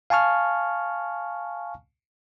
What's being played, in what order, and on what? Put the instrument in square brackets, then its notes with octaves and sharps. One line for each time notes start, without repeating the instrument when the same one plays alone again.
[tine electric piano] F5 G#5 A5 C#6 F6